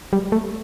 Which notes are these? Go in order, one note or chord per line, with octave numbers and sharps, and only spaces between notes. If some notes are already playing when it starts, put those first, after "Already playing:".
G3
A3